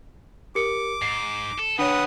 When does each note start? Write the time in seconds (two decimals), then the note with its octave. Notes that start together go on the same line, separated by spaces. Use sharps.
0.55 G4 A#4 D6 C#7
1.02 G#2 C7
1.58 A4
1.79 D#2 C3 D4 B4 C#5 F#5 D#6